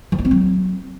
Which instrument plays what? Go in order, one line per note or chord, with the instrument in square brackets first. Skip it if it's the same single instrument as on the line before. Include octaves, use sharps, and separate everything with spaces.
[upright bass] F3
A3
C4
F#3